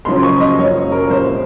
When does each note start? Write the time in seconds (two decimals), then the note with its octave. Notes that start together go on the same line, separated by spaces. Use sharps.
0.05 F#1 F#2 C#3 F3 C6
0.23 C#6
0.40 D#5
0.58 F#1 F#2 C#3 F3 C#5
0.92 A#4
1.10 C2 A#2 F3 C5